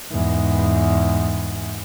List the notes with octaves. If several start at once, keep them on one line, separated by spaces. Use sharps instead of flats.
E2 G#2